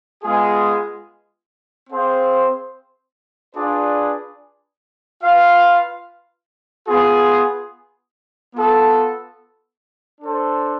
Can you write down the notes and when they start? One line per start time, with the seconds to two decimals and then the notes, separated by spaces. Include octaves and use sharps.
0.22 G#3 B3 F4 G#4
1.88 C4 G#4 C5 F5
3.54 D4 F4 G#4 B4 D5
5.22 F4 B4 F5
6.87 B3 F4 G#4
8.54 B3 F4 A4
10.20 D4 A4 C5